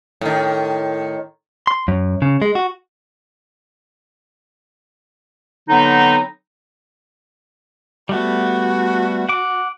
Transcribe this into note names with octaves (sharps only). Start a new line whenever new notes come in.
A2 D#3
C6
F#2
C#3
G#3
F#4
D3 F#3 B3 C4 D#4
G3 A3 B3 F#4
F#5 D6